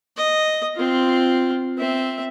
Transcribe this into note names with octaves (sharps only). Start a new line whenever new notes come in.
D#5
C4 F4
C4 E5